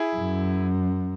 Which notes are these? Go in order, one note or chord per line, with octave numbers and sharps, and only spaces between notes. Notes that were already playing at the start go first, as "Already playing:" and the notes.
Already playing: E4 G#4
F#2